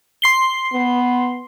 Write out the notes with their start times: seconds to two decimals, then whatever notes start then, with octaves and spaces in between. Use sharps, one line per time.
0.22 C6 C7 G7
0.73 B3